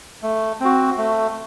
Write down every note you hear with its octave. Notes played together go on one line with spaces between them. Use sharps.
A3
C4 F#4
A3